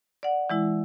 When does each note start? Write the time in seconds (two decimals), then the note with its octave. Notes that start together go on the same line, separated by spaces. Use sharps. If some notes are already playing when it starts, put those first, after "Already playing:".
0.23 D5 F#5
0.50 E3 G#3 E4